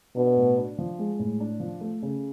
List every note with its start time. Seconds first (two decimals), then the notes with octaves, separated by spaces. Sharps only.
0.16 B2 D4
0.37 A2
0.57 D4
0.78 F3
0.99 G#3
1.19 A2
1.40 D4
1.60 F3
1.81 A3
2.02 C#3